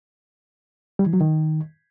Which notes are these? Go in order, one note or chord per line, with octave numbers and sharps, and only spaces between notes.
G3
E3
F#3
D#3